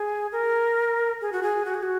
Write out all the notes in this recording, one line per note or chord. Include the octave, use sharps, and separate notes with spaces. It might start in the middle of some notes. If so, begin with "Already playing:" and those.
Already playing: G#4
A#4
G#4
F#4
G#4
F#4
G#4
F#4